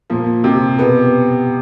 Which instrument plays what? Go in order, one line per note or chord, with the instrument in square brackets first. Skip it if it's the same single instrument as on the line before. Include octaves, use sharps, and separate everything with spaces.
[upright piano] A#2 A#3 [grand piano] F3
[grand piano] C3
[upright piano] B2 B3